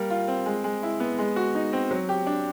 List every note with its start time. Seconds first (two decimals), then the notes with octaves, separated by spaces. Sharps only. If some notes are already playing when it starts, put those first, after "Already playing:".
Already playing: G3 A#3 A#4
0.10 F4
0.28 C4
0.46 G#3
0.64 G#3
0.83 E4
1.00 B3
1.19 G#3
1.36 F#4
1.55 D#4
1.73 C4
1.91 F#3
2.09 G4
2.27 D4